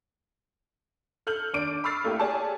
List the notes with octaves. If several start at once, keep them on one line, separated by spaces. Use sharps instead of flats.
A4 F6 G6 F#7
D#2 D4 D6 D7
B5 C#6 E6 F6 A6 C7
A3 A#3 E4 G4
G4 G#4 C#5 D5 G#5 A5